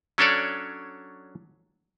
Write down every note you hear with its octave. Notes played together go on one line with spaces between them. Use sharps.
F#3 C#4 D4 A4 C#5 D5